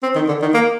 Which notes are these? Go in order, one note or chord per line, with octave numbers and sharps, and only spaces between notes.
C4
D#3
D3
D#3
A#3